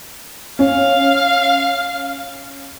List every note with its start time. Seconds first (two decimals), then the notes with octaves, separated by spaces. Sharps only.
0.59 C#4 F5